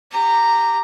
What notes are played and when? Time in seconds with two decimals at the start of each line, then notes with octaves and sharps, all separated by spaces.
0.11 G4 A#5